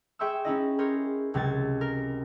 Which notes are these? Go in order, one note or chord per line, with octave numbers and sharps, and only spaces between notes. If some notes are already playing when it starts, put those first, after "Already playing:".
G#4 E5 G5 C6 C#6 E6
C#4 D#4 E4 D#5
G#4 A#4 C5 C#5
C#2 C3 F#3 G#6 A6
A#4